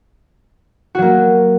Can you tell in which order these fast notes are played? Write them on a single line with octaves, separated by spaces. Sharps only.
F#4 F#3 A#3